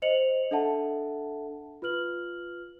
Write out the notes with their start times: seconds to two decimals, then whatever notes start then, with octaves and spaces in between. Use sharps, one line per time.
0.02 C5 D#5 C#7 F7 F#7
0.51 D4 A4 E5 F#5 A5
1.82 F4 B4 F6 F#7